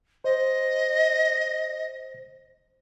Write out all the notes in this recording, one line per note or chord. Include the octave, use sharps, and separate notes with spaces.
C5 D#5